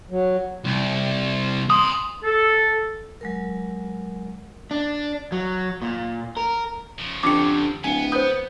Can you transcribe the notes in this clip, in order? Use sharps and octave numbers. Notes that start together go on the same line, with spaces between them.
F#3
C2
A#5 C6 D#6
A4
F#3 G#3 A#4
D4
F#3
A#2
A#4
C#3 F3
F2 D3 G4 D6 C#7
D1 B3 G#5 C#7
B4 C5 D#6 G6